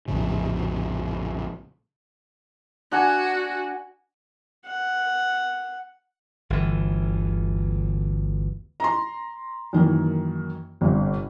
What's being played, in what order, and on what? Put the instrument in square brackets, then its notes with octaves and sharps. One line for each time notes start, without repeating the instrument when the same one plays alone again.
[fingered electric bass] A#1 F2 A2 C#3
[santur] D4 F#5 G#5 [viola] F#4
[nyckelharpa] F#5
[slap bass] G1 D2 E3
[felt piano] A#5 C6
F#2 D#3 E3 A#3
G1 G2 C3